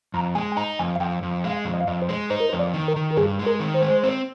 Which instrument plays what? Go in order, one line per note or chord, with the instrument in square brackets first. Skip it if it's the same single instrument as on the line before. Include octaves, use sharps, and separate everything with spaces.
[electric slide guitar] F2 [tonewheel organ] A#5
[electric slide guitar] G#3 [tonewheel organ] G#5
[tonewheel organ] G#5
[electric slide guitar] D#4 [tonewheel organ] A#5
[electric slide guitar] F2 [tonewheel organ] G#5
[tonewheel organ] F5
[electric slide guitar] F2 [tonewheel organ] G5
[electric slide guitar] F2
[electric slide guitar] G#3 [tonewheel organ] F5
[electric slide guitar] F2
[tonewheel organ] D#5
F5
[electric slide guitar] F2 [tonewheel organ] D#5
[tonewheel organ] C5
[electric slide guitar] G#3
[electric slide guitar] D#4 [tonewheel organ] C5
[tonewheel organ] A#4
C5
[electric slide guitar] F2
[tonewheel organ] D5
[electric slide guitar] D#3
[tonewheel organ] A#4
[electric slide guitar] D#3
[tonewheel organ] A#4
[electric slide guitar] G2 [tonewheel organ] G#4
[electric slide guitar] G#3
[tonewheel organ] A#4
[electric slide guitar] D#3
[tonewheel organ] C5
[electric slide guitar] G#3
C4